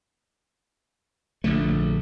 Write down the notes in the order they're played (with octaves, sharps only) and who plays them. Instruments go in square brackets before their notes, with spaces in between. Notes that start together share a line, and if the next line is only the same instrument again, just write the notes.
[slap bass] A#1 D3 A3